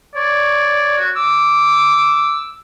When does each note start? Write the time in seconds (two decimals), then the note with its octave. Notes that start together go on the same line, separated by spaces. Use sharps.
0.15 C#5 D5
0.97 F#4
1.16 D6 E6